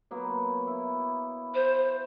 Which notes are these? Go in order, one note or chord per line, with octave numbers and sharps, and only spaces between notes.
F#3 A#3 B3
E4
C5